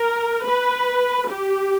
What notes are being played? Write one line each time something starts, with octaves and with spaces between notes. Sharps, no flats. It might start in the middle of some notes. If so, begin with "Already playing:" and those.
Already playing: A#4
B4
G4